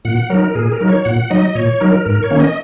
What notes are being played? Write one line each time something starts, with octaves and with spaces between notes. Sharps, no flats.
A#2 F#5
F#3 D#4 A#4
A#2 G#4
A#4
F#3 D#4
C#5
A#2 F#5
F#3 D#4 D#5
A#2 C#5
F#3 D#4 A#4
G#2 A#4
C#5
D#3 A#3 C#4
D#5